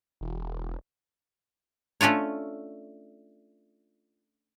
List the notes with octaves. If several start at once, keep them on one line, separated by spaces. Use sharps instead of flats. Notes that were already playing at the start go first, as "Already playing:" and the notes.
E1
A3 C#4 D4 F4 C#5